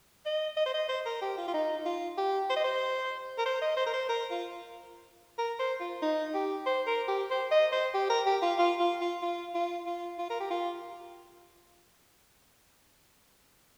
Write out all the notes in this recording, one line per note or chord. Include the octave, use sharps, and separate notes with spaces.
D#5
D#5
C5
D#5
C5
A#4
G4
F4
F4
D#4
F4
G4
C5
D#5
C5
A#4
C5
D#5
C5
A#4
C5
A#4
F4
A#4
C5
F4
D#4
G4
C5
A#4
G4
C5
D#5
C5
G4
A#4
G4
F4
F4
F4
F4
F4
F4
F4
F4
A#4
G4
F4